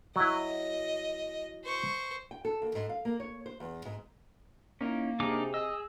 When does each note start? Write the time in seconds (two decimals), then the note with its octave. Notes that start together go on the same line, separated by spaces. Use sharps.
0.16 F#3 E4 D#5
1.64 C5 C#6
2.31 G5
2.45 A4
2.62 D#2
2.75 G#2
2.89 F5
3.05 A#3
3.20 C#5
3.46 C5
3.60 E2
3.85 G#2
4.81 A#3 C#4 D#4 E4
5.20 C3 D4 D#4 G#4 D6
5.54 D#5 E6